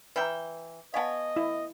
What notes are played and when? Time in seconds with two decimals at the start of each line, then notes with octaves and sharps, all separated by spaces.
0.16 E3 B4 E5 G5 A#5
0.94 B3 C#5 D#5 F5 G#5 A5
1.36 E4